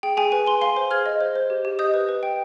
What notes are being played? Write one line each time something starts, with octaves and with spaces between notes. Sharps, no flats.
G#4 G5
G#4 G#5
B4 G#5
B4 G#5 C6
F5 G#5 C6
C5
G#4 F6 G#6
D#5
C5
C5
G4
G4
D#5 D#6 G6
B4
B4
G5